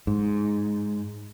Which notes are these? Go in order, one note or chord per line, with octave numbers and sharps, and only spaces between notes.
G#2